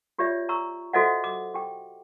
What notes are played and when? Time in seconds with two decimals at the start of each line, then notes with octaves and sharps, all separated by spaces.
0.18 F4 G4 C#5 D5 E5
0.49 A#5 C#6 E6
0.93 F#4 A4 C5 D#5 E5 F#5
1.24 D6
1.54 G4 G5 D6